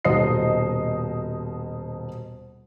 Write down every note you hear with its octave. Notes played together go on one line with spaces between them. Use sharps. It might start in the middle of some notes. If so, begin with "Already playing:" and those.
D#1 B2 C5 D#5 D#6 C7